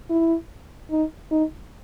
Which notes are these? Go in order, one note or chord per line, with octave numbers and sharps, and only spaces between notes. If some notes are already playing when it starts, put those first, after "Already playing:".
E4
D#4
D#4